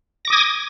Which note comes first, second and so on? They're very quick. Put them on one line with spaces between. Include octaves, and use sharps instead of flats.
A#6 D6 D#6 G#6